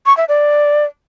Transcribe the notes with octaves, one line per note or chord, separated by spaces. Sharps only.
C#6
E5
D5